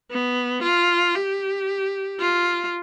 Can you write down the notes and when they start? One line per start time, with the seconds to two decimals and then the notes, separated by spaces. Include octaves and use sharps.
0.11 B3
0.63 F4
1.15 G4
2.19 F4